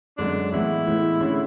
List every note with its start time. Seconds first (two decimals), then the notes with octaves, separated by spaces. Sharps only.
0.17 F#2 D3 G#3 D4
0.52 A2 E3 G#3 B3 E4
0.87 A2 E3 G#3 B3
1.21 D3 A3 C#4 G#4